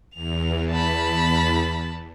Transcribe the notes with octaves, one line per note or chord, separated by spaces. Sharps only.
E2 F7
A5 B5